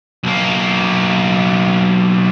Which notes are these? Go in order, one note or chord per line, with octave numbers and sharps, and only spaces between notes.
B1 A#3